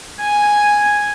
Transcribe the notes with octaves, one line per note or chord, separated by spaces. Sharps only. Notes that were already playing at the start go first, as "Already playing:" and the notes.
G#5